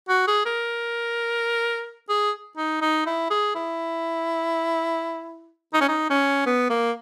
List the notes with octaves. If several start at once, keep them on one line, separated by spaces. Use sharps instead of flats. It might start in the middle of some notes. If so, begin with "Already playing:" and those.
F#4
G#4
A#4
G#4
D#4
D#4
E4
G#4
E4
D#4
C#4
D#4
C#4
B3
A#3